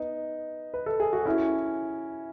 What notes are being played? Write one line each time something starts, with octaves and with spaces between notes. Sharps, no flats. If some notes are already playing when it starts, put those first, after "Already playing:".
Already playing: B3 D#4
B4
A4
G#4
F#4
C#4 E4